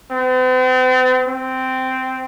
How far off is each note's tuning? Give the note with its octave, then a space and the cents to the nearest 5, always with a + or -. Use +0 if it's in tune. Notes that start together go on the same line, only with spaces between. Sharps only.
C4 -45
C4 -10